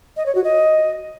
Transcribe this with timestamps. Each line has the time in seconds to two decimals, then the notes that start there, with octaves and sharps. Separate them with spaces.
0.17 D#5
0.26 C#5
0.35 F#4
0.44 D#5